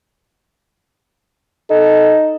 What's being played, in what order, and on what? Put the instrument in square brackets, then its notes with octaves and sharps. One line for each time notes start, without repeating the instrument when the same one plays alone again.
[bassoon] D#4 [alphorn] A4